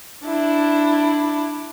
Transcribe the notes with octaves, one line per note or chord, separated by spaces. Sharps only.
D4 E4